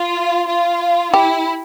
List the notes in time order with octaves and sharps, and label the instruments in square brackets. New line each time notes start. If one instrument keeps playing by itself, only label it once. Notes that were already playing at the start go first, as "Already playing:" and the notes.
Already playing: [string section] F4
F4
[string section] E4 [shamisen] G4